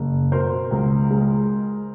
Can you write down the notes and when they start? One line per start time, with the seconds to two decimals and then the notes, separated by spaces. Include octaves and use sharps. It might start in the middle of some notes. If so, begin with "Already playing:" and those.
Already playing: F#1
0.32 B2 A#4 C5
0.71 C#2
1.10 G#3